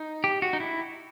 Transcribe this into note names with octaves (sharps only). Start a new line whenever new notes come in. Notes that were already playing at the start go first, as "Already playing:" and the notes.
Already playing: D#4
G4
F#4
D#4
E4